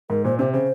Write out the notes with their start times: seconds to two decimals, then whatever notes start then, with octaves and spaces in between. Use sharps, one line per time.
0.10 G#2 A#4
0.25 A#2 C5
0.39 C3 C5
0.53 C#3 C5